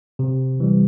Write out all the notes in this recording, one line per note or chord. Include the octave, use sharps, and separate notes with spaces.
C3
E3 G3